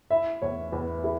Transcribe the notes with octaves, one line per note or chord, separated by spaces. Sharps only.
E4 E5
E2 C#5
E2 B4
E4 G#4